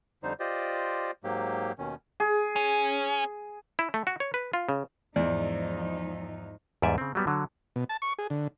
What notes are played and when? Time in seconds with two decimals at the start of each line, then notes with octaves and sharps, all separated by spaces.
0.23 F2 D3 G3 D#4 C5
0.40 F4 G4 C5 D5 D#5
1.24 G#2 F#3 A#3 G4
1.79 D#2 B2 D#3 C#4
2.20 G#4
2.56 C#4
3.79 E4
3.94 A3
4.07 F#4
4.20 C#5
4.34 B4
4.53 F4
4.69 C#3
5.16 E2 G#2 F3 D#4 D5
6.82 E2 G#2 G3 D5 E5 G#5
6.98 C#3 C4
7.15 F#3 G3 B3
7.27 D3 F#3
7.76 B2
7.89 A5
8.02 C#6
8.19 G#4
8.30 D3